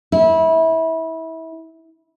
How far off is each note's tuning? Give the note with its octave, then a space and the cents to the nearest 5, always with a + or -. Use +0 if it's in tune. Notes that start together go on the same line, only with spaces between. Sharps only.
E4 -25